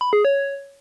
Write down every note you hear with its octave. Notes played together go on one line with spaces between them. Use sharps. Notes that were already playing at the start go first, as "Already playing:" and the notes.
B5
G#4
C#5